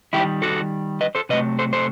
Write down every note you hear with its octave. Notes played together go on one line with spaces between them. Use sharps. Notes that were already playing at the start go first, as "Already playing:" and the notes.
D#3 G3 E4 G4
F#4 A4
B4 D#5
A4 C5
C3 F#3 A3 B4 D#5
A4 C5
A4 C5